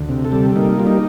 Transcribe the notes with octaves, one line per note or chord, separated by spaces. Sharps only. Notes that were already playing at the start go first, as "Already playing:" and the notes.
Already playing: D2
C3
A4
G3
A#3 D#4
G3 F4
D#4